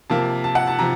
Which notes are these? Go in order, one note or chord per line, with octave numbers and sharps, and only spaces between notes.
C3 F3 A#3 A5
A5
F#5
A5
C3 F3 A#5